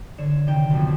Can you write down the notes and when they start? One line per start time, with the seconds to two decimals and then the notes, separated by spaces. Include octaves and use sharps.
0.18 D3 C#5 E7
0.47 C3 D#3 G5
0.70 B1 F2